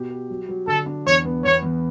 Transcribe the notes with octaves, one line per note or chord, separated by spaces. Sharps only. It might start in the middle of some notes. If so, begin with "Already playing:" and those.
Already playing: B2 G4
G4
F#3
F#3
D3 A4
D4
E2 C#5
B3
E2 C#5
E2